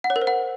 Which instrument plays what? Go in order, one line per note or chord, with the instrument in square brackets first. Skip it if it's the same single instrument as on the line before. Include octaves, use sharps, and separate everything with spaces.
[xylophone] F#5
C#5
A#4
C5
F#5